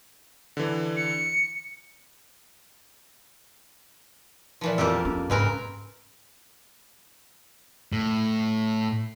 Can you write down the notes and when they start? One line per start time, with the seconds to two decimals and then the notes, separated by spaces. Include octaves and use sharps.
0.57 D3 E3
0.96 C#7
4.61 A#2 E3 F3
4.78 F2 A#3 G4 A4 E6
5.05 C#4
5.30 G#2 C#3 G#3 C4 A#4 B4 G#5
7.92 A2